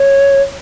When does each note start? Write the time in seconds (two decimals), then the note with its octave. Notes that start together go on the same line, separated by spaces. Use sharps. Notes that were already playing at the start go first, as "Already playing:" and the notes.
Already playing: C#5